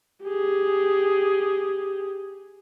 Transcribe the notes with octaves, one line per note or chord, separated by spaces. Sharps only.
G4 G#4